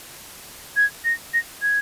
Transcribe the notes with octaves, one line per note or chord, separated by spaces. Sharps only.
G#6
A#6
A#6
G#6